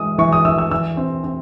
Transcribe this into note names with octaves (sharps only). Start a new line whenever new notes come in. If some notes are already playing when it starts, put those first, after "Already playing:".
Already playing: E3 G#3 D#6
E3 C#6
D#6
E3 E6
E6
E3 E6
C4
C4